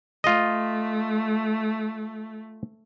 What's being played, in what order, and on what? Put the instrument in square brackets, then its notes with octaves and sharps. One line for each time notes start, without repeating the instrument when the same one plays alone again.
[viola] A3 [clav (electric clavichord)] F4 D#5